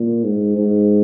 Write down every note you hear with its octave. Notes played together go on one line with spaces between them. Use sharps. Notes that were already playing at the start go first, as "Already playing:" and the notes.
Already playing: A#2
G#2
G#2